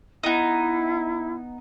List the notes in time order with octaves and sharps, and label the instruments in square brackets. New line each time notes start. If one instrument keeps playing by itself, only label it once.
[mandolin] B3 D#4 [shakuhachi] E4